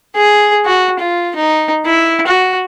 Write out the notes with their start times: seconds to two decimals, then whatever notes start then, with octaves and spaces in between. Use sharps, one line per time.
0.15 G#4
0.66 F#4
0.99 F4
1.35 D#4
1.86 E4
2.27 F#4